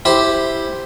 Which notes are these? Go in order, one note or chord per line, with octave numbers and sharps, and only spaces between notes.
E4 G4 C5